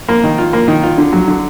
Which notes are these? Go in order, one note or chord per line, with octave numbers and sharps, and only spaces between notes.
A#3
D#3
F4
A#3
D#3
F4
D3
F#3
D3